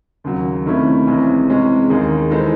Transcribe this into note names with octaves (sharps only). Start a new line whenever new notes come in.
D#2 C#3 F#3
C3 D#3 A3 C#4 E4
C2 C3 E3 G#3 C#4
C3 E3 G#3 C#4
D#2 D#3 G#3 D#4 G#4
E3 G#3 D#4 A4 C5